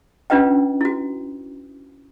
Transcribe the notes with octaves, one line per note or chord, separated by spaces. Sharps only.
C#4 D4 F4 B4 D#5 G5
E4 F#4